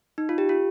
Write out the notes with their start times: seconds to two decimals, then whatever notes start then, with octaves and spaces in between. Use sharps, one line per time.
0.18 D#4
0.29 F4
0.38 G4
0.49 F4